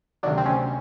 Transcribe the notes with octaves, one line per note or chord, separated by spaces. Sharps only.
D2 C3 D#3 F#3 D4
C4
C#4